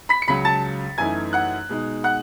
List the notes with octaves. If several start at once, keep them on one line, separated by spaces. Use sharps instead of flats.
B5 B6
C#7
C#2 C#3 F#3 B5 B6
A5 A6
F#2 E3 A3 D#4 G#5 G#6
F#5 F#6
B2 G#3 D#4
F#5 F#6